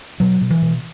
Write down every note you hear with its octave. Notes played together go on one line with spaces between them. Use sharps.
B2 F#3
B2
E3
B2